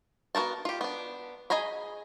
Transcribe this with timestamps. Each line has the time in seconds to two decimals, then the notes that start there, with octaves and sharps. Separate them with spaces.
0.35 B3 F#4 A#4 A5
0.65 F4 G4
0.81 B3 D4
1.50 G#4 D#5 G#5 A#5 B5